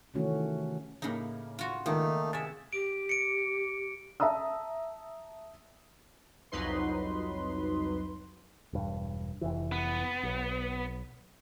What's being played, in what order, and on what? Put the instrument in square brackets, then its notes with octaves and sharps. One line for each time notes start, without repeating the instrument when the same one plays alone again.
[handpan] C3 D#3 E3 A3 C#4 F#4
[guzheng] A2 D#4 [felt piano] C#3 A#3
[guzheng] F4 F#4
[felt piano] C#2 [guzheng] D#3 [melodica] A3 A#3 D#4
[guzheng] C3 E5 [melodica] G#4 [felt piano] A6
[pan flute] G4 [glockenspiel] D7
[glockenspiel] C#7 D7
[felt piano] E5 A5 A#5 D#6 E6
[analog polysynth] C2 F2 F#3 D#4 B4 C6
[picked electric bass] E1 G2
F1 E3
[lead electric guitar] B3
[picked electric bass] B1